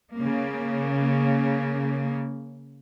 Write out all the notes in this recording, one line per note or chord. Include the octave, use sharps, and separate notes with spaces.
C#3 A#3